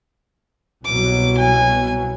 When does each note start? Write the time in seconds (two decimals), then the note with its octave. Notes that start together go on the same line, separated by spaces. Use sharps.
0.85 C2 B2 F#3 D6
1.37 G#5